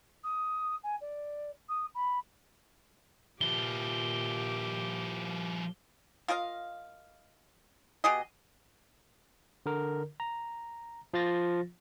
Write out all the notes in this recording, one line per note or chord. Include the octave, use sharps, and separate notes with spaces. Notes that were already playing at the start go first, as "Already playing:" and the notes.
D#6
G#5
D5
D#6
B5
A#2 F3 E4 G4 G7
F4 A#4 D#5 F5
B2 G4 G#4 D#5
D3 A#4
A#5
F3 F4 A6 A#6